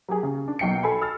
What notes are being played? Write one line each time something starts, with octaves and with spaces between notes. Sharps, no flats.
F#3 G4 G#4
C#3
D4
B1 F#3 G5 C7 C#7
A4 G#5 B5
E6 F6 A6